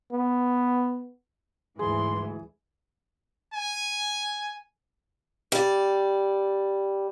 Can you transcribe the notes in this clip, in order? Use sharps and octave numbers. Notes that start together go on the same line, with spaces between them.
B3
D2 G#2 E3 G#4 C6
G#5
G3 D5